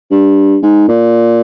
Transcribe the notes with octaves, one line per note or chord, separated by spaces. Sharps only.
G2
G#2
A#2